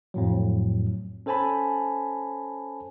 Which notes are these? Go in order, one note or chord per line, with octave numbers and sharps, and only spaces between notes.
F2 A2 F#3
C#4 A4 C5 G#5 A5 B5